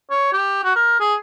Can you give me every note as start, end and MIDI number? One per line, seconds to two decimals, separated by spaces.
0.11 0.33 73
0.33 0.62 67
0.64 0.73 66
0.76 0.97 70
1.00 1.15 68